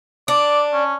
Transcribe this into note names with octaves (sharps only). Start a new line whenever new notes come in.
D4 D5
C#4